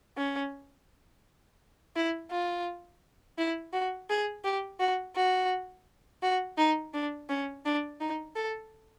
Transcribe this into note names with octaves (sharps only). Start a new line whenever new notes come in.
C#4
E4
F4
E4
F#4
G#4
G4
F#4
F#4
F#4
D#4
D4
C#4
D4
D#4
A4